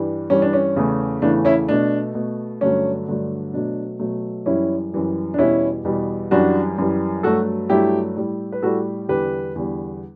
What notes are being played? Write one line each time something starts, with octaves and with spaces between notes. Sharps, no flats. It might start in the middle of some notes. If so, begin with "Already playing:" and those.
Already playing: G2 E3 G3
G2 E3 G3 C#4
D4
C#4
E2 C#3 E3 A3
E2 C#3 E3 A3 D4
C#4 E4
B2 A3 D4
B2 A3
G2 D3 F#3 A3 C#4
G2 D3 F#3 A3
B2 F#3 A3 D4
B2 F#3 A3
F#2 E3 G3 C#4 E4
F#2 E3 G3
D4
E2 B2 G3 C#4 E4
E2 B2 G3
F#2 E3 G3 D4 F#4
F#2 E3 G3
G2 F#3 A3 F#4 A4
G2 F#3 A3 E4 G4
A2 G3
B4
A2 G3 F#4 A4
E2 D3 G3 G4 B4
E2 D3 G3